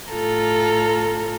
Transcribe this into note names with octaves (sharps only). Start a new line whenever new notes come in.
A2 F4 A4 A#5